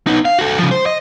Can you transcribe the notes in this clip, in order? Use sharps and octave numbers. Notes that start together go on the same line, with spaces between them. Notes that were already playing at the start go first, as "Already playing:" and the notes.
B3 D#4
F5
F#4 A4
C#3 F3
C5
D#5